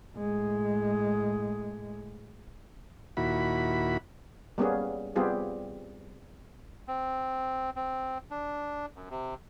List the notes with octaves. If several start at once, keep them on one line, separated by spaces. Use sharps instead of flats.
A2 G#3
D#2 A#2 E4 F#4 B5
G3 A#3 B3 C#4 G#4
G3 B3 C4 F4 G4 G#4
C4
C4
D4
F#2
C3